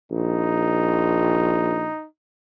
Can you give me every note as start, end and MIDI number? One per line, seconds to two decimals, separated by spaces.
0.12 1.88 34
0.12 2.07 63